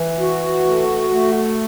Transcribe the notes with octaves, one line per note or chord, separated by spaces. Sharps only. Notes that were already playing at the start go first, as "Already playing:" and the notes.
Already playing: E3
F#4
A3
A3